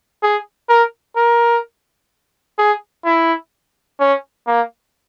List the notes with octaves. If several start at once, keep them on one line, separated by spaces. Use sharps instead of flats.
G#4
A#4
A#4
G#4
E4
C#4
A#3